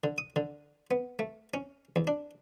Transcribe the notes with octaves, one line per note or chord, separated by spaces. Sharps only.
D3
D#6
D3
B3
A3
C#4
E2
D4